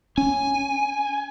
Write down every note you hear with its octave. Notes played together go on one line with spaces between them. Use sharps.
C#4 G#5